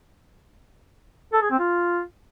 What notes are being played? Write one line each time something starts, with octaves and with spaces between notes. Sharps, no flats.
A4
G#4
C4
F4